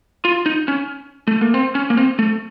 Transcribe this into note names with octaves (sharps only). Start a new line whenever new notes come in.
F4
D#4
C#4
A3
A#3
C4
C#4
A#3
C4
A3